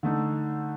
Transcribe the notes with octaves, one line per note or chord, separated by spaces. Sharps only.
D3 A3 D#4